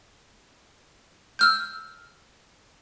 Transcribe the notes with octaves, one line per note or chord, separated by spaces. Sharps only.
E6 F6 G6